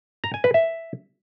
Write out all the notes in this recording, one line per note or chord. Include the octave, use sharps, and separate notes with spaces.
A#5
G#5
B4
E5